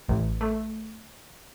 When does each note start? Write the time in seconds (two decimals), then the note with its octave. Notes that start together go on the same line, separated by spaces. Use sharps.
0.08 A1
0.41 A3